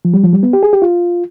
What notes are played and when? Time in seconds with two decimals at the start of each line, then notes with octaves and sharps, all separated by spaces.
0.05 F3
0.14 G3
0.24 F3
0.33 G3
0.43 B3
0.53 G4
0.63 G#4
0.73 G4
0.82 F4